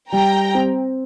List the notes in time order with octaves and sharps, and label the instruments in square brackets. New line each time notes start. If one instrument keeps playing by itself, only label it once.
[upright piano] G3 [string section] G5 A#5
[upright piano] C4